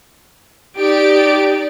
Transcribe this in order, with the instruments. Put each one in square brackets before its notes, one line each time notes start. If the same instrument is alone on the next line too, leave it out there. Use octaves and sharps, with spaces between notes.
[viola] D#4 D5 [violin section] G4 D7